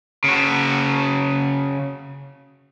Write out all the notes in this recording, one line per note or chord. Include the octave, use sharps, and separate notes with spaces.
C#3 F#4